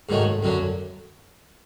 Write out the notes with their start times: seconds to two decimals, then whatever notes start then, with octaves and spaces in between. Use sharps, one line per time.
0.09 G#2 D#3 F#3 A3
0.43 F#2 D3 F#3